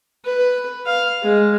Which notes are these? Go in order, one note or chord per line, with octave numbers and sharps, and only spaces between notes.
B4
F5
G#3